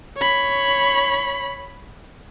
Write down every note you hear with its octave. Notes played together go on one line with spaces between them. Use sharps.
C#5 B5